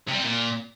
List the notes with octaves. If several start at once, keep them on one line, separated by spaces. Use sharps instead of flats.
C3
G3
C4
A#2